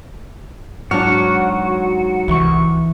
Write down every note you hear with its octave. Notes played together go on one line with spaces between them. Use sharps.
G#2 F#3 D4 F#4 F6
C2 E3 C#6